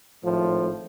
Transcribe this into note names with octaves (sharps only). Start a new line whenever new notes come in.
G#1 A2 F3